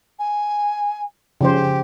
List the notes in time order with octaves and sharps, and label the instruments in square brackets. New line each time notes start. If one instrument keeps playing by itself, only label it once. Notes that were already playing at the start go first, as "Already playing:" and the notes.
[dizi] G#5
[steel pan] C#3 F3 C5 [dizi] G4